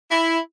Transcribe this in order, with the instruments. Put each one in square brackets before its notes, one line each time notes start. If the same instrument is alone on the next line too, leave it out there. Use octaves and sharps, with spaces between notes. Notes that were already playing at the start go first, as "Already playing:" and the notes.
[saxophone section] E4